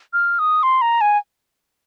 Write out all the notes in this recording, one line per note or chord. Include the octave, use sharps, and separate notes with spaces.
F6
D#6
C6
A#5
G#5